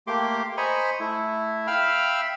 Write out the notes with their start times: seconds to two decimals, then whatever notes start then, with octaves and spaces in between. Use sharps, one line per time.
0.07 A3 A#3 G4 C6 D6
0.57 C5 D#5 G#5 A#5 B5 C#6
1.00 A3 E4
1.67 E5 F5 G5 B5 E6 F6